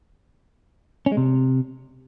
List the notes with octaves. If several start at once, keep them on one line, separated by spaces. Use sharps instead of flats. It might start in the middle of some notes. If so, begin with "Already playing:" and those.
C#4
G#3
C3